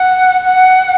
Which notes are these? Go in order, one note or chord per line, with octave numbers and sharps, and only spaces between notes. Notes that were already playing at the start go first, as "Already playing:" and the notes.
Already playing: F#5
F#5